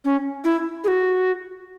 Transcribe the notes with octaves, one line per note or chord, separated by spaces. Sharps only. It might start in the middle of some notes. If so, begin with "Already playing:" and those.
C#4
E4
G#4
F#4